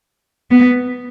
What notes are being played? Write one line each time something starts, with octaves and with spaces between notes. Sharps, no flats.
B3